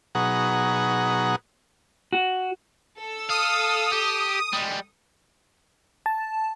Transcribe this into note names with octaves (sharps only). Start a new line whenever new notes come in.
B2 F#3 D#4 G#4 F#5 A#5
F#4
A4 E6
F5 D#6
G4
G3 G#3
A5